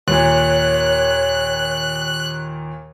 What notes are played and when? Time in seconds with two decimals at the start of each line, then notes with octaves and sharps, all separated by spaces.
0.08 D#2 A#2 C#5 F#6